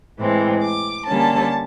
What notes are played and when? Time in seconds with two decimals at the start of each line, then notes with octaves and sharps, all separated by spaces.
0.18 A2 E3 G#3 C4
0.62 D6
1.07 D3 G3 A#3 C#4 A5